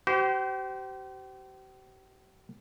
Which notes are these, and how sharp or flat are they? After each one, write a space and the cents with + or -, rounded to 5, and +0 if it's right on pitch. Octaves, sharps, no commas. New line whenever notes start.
G4 -40 C5 -25